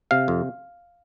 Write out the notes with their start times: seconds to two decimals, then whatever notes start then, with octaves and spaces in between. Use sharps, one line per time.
0.11 C3 F5
0.28 F2